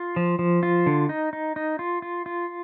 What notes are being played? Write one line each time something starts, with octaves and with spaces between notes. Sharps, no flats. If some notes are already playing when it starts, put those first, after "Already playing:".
Already playing: F4
F3
F3
F4
D3
D#4
D#4
D#4
F4
F4
F4